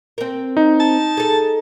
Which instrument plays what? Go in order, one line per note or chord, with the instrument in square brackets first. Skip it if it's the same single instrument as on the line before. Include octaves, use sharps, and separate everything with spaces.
[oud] C4 A#4
[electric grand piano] D#4
[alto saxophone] A5
[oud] G#4 A4